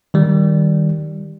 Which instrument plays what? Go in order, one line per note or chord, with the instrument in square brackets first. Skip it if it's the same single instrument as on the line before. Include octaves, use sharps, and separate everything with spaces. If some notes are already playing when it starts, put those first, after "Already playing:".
[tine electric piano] D#3 G3